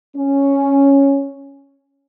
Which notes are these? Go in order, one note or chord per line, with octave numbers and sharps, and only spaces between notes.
C#4